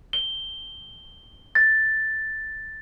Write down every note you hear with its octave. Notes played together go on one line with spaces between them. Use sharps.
G7
A6